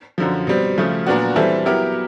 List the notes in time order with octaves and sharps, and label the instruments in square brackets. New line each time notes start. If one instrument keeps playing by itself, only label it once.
[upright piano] F#2 D3 F3
B2 G3 C4
C#3 F3 A3
A#2 F#3 B3 D4 F#4
E3 G3 C4 E4 A4
F#3 B3 E4 G4 A#4